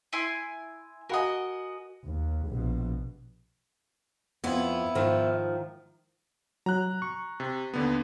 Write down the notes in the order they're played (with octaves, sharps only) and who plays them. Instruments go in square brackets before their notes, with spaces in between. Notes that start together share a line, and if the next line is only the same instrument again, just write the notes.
[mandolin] E4 G#5 C6
[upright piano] F#4 F#5 G#5 [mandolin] A#4 D#5
[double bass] D#2
A#1 B2
[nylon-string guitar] F2 [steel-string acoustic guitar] B3 E4
[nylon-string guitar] G#2 D#3 F3
[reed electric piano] F#3 [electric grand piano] A#5 F#6
[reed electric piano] C#6
[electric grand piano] C3
D#2 D3 B3